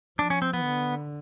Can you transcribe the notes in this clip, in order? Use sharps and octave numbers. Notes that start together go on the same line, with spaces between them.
F3 D4
C#4
C4
B3
D3